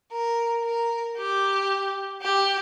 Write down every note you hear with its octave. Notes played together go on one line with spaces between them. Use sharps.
A#4
A#4
G4
G4